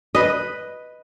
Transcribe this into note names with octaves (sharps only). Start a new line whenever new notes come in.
B4 D#5